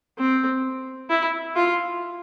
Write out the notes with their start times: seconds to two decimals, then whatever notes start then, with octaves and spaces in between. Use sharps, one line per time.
0.18 C4
1.10 E4
1.56 F4